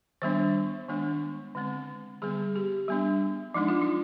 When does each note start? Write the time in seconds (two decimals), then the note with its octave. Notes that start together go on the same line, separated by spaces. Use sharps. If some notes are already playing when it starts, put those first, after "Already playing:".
0.22 D#3 G3 B3 D4 C5
0.89 D#3 G#3 B3 D4
1.55 D3 G#3 C4
2.22 D3 G3 B3 G#4
2.56 G4
2.88 G3 B3 D4
3.54 F3 G#3 D4 D#4
3.68 F4
3.82 D#4